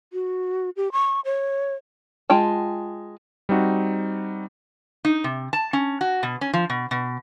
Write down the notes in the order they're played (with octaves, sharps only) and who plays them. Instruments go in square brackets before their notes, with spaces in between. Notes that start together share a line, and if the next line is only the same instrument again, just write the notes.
[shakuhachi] F#4
G4
C#6
C#5
[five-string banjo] G#3 F4 G5 A5
[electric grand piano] G3 C4 D#4 F#4
[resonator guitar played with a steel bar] D#4
C3
A5
C#4
F#4
B2
C#4
F3
B2
B2